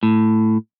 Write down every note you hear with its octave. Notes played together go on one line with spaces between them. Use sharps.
A2